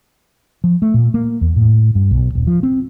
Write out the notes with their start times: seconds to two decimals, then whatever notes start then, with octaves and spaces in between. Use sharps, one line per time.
0.64 F3
0.82 A3
0.94 A#2
1.14 A#3
1.41 E2
1.56 A2
1.95 G2
2.11 B1
2.35 D#1
2.47 F3
2.63 C4